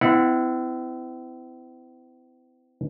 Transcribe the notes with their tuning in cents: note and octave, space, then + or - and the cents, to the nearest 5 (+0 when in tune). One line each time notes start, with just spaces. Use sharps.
C4 -45 E4 +0 F#5 -20